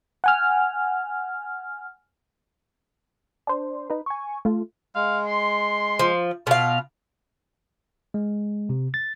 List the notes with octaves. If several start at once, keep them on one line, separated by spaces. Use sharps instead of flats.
F#5 G#5 F6
D4 C5
D#4 B4
G#5 C#6
A3 F4
G#3 F5
C6
F3
B2 F4 F5
G#3
C3
A6